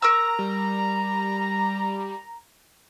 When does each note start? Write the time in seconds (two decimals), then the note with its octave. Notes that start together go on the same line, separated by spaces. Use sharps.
0.02 A#4 A#5 C#6 E6
0.39 G3